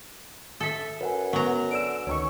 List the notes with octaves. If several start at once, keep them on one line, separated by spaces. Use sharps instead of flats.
A4 E5
F#2 B4 F#5 G#5
F#3 B3 A#5
D3 E6 D7
D2 D#3 C#4 C#6